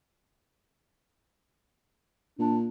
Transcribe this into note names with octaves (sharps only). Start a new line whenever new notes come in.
A#2 D4